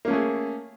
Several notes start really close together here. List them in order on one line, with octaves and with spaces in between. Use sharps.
A#3 C#4 A3 G#4